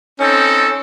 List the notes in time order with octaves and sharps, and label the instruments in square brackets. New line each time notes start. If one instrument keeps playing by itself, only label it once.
[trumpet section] C4 D#4 A4 [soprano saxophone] C#4